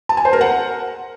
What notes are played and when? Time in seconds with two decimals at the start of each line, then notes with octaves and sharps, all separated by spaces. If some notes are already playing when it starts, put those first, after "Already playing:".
0.09 A5
0.17 G#5
0.25 C5
0.33 A#4
0.41 F#5